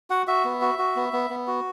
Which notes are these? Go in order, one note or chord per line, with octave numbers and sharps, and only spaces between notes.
F#4 F#5
F#4 E5
B3
F#4
F#4
B3
B3
B3
F#4